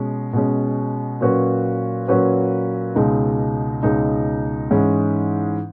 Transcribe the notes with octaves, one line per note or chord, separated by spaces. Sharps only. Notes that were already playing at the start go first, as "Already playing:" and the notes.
Already playing: B2 G#3 C#4
B2 G#3 C#4
A#2 F#3 C#4 F#4 B4
A#2 F#3 C#4 F#4 B4
C#2 B2 G#3 D#4
C#2 B2 G#3 D#4
G#2 E3 G#3 C#4 E4